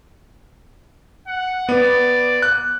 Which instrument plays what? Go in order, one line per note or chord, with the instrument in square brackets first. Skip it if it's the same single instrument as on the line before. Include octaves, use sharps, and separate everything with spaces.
[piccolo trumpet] F#5
[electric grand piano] B3 [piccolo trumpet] D5
[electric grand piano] F#6